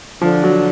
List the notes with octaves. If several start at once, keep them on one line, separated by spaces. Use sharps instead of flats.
D3 F3
F#3